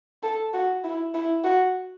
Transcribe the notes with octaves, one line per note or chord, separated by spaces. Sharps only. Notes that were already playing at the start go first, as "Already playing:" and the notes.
A4
F#4
E4
E4
F#4